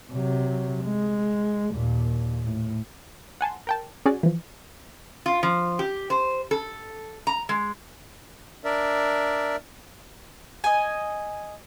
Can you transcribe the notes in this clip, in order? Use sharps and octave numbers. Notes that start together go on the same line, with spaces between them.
C3 F#3
G#3
D#2 A#2
A2
F#5 G#5 A5 C6
A#4 G5 A5
C#4 F#4 G#4 D5 G#5
E3 F3
F4
F3
G4
C5
A4
A#5
G#3
D4 A#4 D5 E5
D#5 G#5